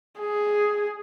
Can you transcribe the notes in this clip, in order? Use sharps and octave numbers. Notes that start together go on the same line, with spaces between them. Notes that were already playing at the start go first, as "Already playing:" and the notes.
G#4